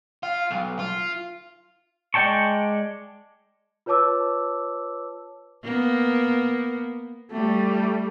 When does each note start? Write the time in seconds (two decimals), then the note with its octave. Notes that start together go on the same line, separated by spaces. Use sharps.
0.23 F4
0.51 B1
0.80 F4
2.14 G#3 D5 G5 A5 C#6
3.86 F4 B4 C#5 A5 D6 E6
5.64 A#3 B3
7.31 G3 A3